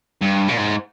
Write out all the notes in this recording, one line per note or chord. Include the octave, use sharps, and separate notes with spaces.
G2
A#2
G#2